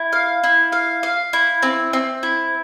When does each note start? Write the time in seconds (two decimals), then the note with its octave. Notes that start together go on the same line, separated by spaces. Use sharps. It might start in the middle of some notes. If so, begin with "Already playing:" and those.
Already playing: E4
0.13 F5
0.44 E4
0.72 F5
1.03 F5
1.33 E4
1.63 C4
1.93 C4
2.23 E4